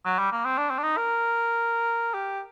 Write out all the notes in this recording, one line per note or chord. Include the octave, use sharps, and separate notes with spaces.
F#3
G3
A#3
C4
D4
C4
D4
D#4
A#4
G4